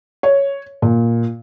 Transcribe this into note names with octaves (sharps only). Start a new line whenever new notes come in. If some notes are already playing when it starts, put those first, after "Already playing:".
C#5
A#2